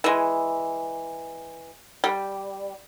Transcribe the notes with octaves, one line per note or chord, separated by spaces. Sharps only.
E3 G#3
G3